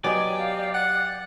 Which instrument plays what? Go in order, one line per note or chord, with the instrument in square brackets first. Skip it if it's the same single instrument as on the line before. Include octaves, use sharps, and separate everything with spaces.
[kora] F#3 B3 D#5 [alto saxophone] G4 [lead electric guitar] D5 [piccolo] G#5
[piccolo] F5
[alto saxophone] F#5 [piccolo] A6